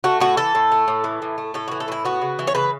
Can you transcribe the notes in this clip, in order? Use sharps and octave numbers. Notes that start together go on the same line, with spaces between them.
A3 F#4
A2 F#4
E3 A4
A2
A3
A2
E3
A2
A3
A2 A4
E3 F#4
A4
A2 E4
B3 F#4
C#3
E3
C#5
C#3 B4